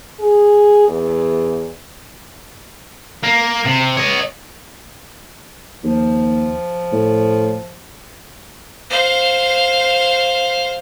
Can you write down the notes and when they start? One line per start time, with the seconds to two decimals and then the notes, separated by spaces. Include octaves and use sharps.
0.20 G#4
0.88 E2
3.23 A#3
3.65 C3
3.97 C#5 D#5
5.84 D#2 F3
6.93 A2
8.90 C5 F5